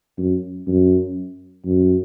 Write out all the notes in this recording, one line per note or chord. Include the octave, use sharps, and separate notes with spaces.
F#2
F#2
F#2